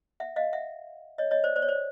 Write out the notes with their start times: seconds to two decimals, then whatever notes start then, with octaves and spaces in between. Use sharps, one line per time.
0.20 E5 F#5
0.36 D#5 F5
0.53 E5 F#5
1.18 C#5 D#5
1.31 C#5 D#5
1.44 C5 D5
1.56 C5 D5
1.62 C#5
1.68 C5 D5